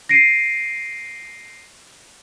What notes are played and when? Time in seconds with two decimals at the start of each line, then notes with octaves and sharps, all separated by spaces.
0.09 A#6 C7 D7 D#7